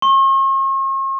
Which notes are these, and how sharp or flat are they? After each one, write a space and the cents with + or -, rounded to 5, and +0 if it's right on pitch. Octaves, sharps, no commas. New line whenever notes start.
C#6 -45